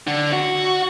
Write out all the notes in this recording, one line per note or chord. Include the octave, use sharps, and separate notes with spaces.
D3
F#4